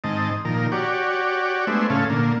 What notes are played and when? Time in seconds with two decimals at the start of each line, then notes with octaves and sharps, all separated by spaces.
0.04 G#2 D#3 C4 D#5 A5
0.45 A#2 D#3 F3 A#4
0.72 F#4 G4 C#5 D5
1.67 G#3 A3 B3 D4 C5 E5
1.90 A2 C#3 C#4 A4 F5
2.10 A#2 D3 A#3